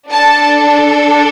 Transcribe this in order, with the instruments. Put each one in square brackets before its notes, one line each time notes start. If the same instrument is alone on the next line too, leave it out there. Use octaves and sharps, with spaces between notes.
[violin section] D4 A4 A5